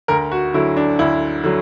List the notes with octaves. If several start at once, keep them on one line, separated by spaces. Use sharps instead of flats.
D2 A#4
F#4
D3 F#3 E4
D4
D2 E4
D3 F#3